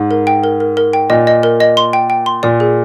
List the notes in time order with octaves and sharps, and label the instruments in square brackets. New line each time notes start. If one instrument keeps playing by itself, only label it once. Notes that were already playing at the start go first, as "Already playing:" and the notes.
Already playing: [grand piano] G#2
[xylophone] A#4
G5
A#4
A#4
A#4
G5
[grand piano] A#2 [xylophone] D#5
[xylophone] D#5
A#4
D#5
C6
G5
G5
C6
[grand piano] A#2 [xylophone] D5
[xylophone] G#4